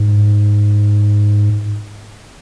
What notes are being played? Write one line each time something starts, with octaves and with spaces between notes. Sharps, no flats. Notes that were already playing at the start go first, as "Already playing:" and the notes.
Already playing: G#2